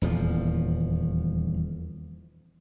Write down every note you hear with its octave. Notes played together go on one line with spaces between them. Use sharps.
D#1 E2 F3